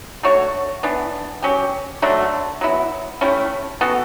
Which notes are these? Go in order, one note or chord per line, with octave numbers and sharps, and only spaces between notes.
A3 D4 F#4 C#5
E3 B3 D4
F#3 C#4 G4
D3 F#3 A3 D4
F#3 B3 E4
A3 C#4 E4 G4
E3 B3 F#4 A4